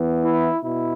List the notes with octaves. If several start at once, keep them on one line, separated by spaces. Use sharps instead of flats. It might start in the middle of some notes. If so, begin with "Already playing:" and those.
Already playing: E3 B3
E4
B2 E4